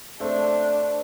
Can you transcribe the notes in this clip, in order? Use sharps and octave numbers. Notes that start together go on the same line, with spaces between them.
A3 C4 D4